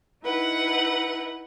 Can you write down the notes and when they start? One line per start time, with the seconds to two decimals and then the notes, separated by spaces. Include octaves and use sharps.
0.24 D#4 E4 B4 F#5